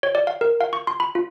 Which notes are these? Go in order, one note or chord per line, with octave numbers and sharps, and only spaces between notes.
C#5
D5
F5
A#4
F5
C#6
C6
B5
F4